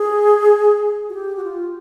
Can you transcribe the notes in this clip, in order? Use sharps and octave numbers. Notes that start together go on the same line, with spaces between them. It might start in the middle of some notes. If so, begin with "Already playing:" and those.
Already playing: G#4
F#4
G4
F#4
F4